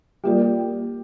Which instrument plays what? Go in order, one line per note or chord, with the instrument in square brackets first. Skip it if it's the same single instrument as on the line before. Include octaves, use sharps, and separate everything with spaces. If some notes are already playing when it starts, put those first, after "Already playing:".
[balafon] G3 A#3 F4 A#4 D5 [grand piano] G4